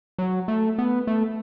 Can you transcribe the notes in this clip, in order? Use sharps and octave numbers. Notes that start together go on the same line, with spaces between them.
F#3
A3
B3
A3